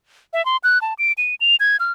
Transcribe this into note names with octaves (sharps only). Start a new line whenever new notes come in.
E5
C6
F#6
A5
D7
D#7
F7
G#6
F6